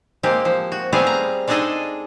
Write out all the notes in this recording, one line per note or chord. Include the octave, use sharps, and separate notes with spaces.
G#3 A#3 C4 G4
F3
F#4
G3 A3 B3 C4 G#4 F5
A#5
G#3 D4 D#4 G#4 A4 D#5